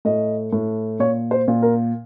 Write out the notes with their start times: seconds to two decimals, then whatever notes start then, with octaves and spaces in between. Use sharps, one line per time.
0.05 A2 D#5
0.52 A2
0.99 A#2 C#5
1.31 C5
1.48 A#2
1.62 A#4